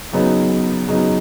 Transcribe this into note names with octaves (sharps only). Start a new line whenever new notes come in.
C#3 F#3 B3 D#4
C#3 F#3 B3 D#4